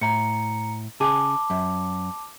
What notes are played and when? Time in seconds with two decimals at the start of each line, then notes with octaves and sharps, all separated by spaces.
0.01 A2 A#5 C#7
1.00 C#3 G#4 A5 D6
1.50 F#2